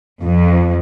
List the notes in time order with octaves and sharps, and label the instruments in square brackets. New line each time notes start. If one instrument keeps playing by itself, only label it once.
[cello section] F2